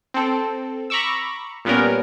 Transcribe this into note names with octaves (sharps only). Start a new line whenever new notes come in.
C4 A4
A#5 B5 C#6 D6 E6
A#2 G3 B3 C#4 A#4